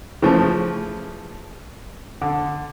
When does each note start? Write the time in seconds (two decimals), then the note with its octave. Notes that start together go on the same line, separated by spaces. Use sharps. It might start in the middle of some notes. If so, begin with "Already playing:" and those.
0.22 C#3 E3 F3 A3
2.21 D3